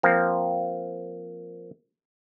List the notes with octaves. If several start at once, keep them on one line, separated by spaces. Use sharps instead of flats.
F3 A#3 C4